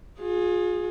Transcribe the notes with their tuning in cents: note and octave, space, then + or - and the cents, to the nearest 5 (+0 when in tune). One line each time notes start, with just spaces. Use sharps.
F4 +35 G#4 +0